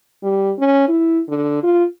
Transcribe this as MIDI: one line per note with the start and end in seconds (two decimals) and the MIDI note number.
0.23 0.52 55
0.59 0.88 61
0.88 1.21 64
1.29 1.61 50
1.63 1.84 65